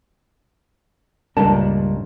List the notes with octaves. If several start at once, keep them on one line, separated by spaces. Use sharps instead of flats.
C#2 G2 A#2 G3 D4 A#4 A5